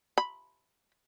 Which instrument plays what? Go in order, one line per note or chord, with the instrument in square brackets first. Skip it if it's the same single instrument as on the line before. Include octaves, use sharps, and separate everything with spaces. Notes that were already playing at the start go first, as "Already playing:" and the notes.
[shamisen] B5